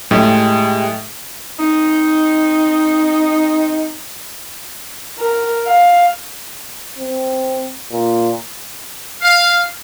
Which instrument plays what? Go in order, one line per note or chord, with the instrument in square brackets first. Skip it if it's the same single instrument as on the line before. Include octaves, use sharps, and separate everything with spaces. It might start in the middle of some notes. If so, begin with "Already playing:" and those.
[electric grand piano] A2 [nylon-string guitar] G#3 G4 C#5
[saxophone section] C4 D#4
[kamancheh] A#4
F5
[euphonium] C4
A#2
[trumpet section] F5